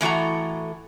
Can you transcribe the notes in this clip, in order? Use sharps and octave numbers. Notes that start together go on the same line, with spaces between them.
A2 E3 F#4 A4 A#5